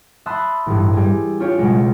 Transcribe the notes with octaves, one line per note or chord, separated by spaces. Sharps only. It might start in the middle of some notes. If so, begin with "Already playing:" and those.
E5 A5 B5 C6 D#6 F#6
A1 G2
G3 G#4
C#4 D4 F4 G4 C#5
C#2 B2 G3 G#3